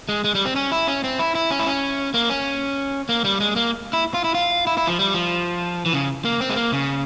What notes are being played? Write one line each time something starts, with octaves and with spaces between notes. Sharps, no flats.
G#3
G#3
G3
C4
C#4
E4
C#4
C4
E4
E4
C#4
E4
C#4
A#3
C#4
A#3
G3
G#3
A#3
E4
F4
E4
F4
E4
E4
F3
G3
F3
E3
C#3
A#3
C4
G#3
A#3
C#3